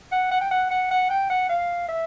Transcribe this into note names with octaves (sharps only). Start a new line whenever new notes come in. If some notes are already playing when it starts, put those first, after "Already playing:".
F#5
F#5
G5
F#5
F#5
F#5
G5
F#5
F5
E5